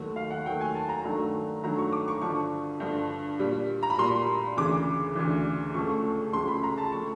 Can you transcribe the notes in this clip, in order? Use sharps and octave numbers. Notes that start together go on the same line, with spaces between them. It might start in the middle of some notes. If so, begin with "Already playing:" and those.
Already playing: D#2 D#3 F#3 A3
F5
F#5
D#2 D#3 F#3 A3 G5
G#5
A5
A#5
G2 D#3 F#3 A3 A#5
G2 D#3 F#3 A3 A#5
C#6
D6
C#6
G2 D3 F3 C#6
G2 D3 F3
A#2 G3
A#5
B5
A#2 G3 C6
D2 C#3 E3 D6
D2 C#3 E3
C#2 C#3 F3 A3 C#6
C#2 C#3 F3 A3 C6
B5
A#5
A5
F3 A3 C#6